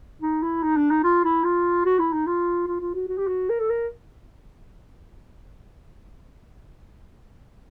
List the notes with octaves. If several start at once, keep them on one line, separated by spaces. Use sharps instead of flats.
D#4
E4
D#4
D4
D#4
F4
E4
F4
F#4
E4
D#4
F4
F4
F4
F#4
F#4
G4
F#4
A#4
A4
A#4